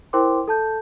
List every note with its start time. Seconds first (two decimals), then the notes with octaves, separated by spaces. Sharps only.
0.13 E4 A#4 C5 G5 C6 D6
0.48 A4 A5 G6